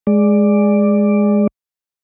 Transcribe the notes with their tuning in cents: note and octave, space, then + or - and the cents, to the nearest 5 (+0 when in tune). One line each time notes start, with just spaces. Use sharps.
G#3 +0 D5 +5